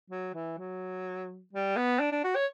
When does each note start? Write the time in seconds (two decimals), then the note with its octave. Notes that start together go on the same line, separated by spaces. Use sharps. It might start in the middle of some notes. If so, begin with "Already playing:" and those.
0.10 F#3
0.34 E3
0.58 F#3
1.53 G3
1.77 B3
2.00 D4
2.12 D4
2.24 F#4
2.35 C#5